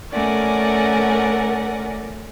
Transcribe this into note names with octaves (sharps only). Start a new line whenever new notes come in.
A3 C#4 A#4 D5 F#5 G#5